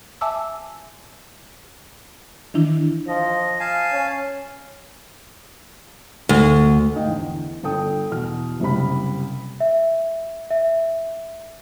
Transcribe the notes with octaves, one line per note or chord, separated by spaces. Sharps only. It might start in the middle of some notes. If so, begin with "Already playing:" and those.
E5 G#5 A5 D6 E6
D#3 E3 D4 E4
F3 D#5
F5 G#5 A5
C#4
D2
G#2 D#5 F5 G5
E2 D3
G1 A4 G5 D#6
E2 B2 F6
F#1 C3 G3 B5
E5
E5